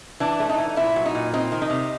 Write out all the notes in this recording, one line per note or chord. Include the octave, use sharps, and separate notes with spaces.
E3 D4
A3
D#4
E3
A#2 E4
F#3
D#4
A#2
C4 D#4
D#3
D#4
C3